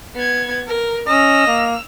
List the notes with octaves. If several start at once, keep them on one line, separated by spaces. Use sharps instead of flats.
B3 G#6
A#4
C#4 D#5 E6 F7
A#3